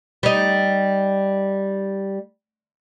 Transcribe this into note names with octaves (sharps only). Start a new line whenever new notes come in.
G3 D#4